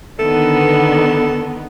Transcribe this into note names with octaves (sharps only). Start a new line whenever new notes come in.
D3 D#3 B3 A4